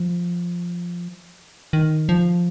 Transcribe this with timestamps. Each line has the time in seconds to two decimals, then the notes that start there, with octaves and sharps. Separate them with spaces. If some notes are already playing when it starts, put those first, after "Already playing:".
Already playing: F3
1.73 D#3
2.09 F3